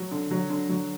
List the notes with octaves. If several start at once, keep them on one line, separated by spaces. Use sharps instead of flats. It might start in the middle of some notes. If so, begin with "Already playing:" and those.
Already playing: F#3
D3
F#3
D3
F#3